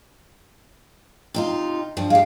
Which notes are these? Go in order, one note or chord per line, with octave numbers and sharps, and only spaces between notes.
C3 D#4 F4
G2 F3
G#3 G4 F5